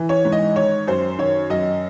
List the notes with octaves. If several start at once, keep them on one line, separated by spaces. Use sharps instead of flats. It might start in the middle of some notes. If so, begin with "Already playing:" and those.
Already playing: E3
C#5
G#2
D#5
D#3 C#5
F#2 C5
D#3 C#5
F#2 D#5